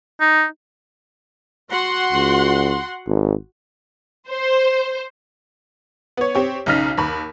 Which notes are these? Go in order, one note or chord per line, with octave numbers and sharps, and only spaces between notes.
D#4
F#4 F#5 C6
C#2
G#1
C5
B3 C#5
C4 G4 C#5
B1 C#3 D#4 F6 B6
D#2 B5